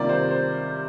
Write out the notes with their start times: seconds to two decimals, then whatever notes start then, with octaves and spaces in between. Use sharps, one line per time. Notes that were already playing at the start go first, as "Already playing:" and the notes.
Already playing: C3 D#3 G3 A#3 F4 D5
0.09 C5
0.31 C5